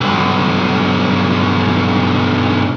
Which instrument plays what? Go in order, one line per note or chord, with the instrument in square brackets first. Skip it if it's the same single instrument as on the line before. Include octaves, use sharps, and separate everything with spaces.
[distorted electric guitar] B1 G2